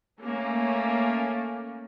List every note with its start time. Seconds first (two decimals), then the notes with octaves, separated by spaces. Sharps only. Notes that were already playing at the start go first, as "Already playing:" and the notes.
0.22 A3 A#3 C#4